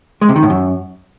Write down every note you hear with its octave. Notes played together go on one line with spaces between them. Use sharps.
G#3
C3
D#3
A2
F#2